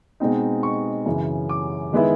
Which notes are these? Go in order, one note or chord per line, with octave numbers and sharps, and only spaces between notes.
B2 G#3 C4 D#4
C#6
F#2 C#3 E3
D6
D#3 G#3 B3 E4